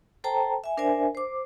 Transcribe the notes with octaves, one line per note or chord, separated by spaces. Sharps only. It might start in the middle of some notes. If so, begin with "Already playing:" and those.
A4 C5 G5 A5 A#5
E5 G#5
D4 A#4 C5 D5 E5 G#5
C5 D6